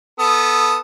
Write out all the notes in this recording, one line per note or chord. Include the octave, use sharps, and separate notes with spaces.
B3 A4 D#6